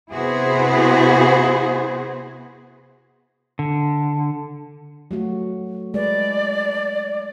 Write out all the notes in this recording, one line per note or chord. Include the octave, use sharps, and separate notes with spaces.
C3 B3 E4 F#4 G#4 C5
D3
F#3 A3 F#4
G#3 B4 D5